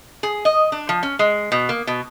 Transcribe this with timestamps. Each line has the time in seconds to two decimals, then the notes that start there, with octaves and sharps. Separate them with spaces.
0.23 G#4
0.45 D#5
0.72 D4
0.89 F3
1.03 C#4
1.19 G#3
1.52 B2
1.69 A#3
1.87 B2